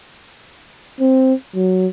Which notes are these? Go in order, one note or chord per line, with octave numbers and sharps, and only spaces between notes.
C4
F#3